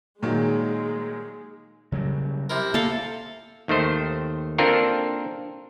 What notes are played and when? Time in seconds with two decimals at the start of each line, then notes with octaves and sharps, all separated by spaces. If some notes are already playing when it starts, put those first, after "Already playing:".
0.23 A#2 D#3 F#3 G#3
1.92 C#3 F#3 G3
2.50 C3 E4 A#4
2.74 A#3 A4 F5
3.68 D#2 D#3 A3 C5
4.58 A#3 C4 D4 F4 A4 A#4